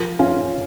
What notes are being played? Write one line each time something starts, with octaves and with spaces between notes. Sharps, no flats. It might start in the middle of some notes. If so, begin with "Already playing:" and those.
Already playing: F3 A#4
C#4 F4